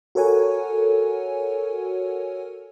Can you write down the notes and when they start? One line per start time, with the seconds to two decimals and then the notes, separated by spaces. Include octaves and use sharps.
0.15 F#4 A4 A#4 C#5 F#5 G#5